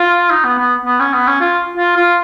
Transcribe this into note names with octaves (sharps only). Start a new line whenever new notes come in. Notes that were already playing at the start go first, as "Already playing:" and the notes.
Already playing: F4
D#4
B3
B3
B3
C#4
B3
C#4
F4
F4
F4